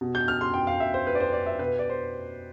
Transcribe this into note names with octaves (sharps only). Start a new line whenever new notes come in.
B2
G6
F6
C6
G5
F5
E5
C5
B4
D5
C5
D5
E5
B2 B4
D5
C5